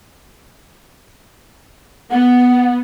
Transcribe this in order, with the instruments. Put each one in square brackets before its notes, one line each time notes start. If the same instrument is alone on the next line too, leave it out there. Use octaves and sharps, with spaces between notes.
[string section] B3 [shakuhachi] F#5